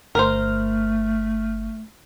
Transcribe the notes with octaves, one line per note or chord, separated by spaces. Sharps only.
G1 A3 A#4 C5 F6